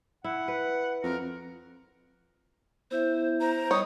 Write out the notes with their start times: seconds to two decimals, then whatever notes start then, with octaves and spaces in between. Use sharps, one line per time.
0.24 E4 F#5
0.48 B4
1.03 F2 A#4
2.91 B3 E4 C5 E5
3.41 C5 A#5
3.71 G3 C#5 D#5 D#6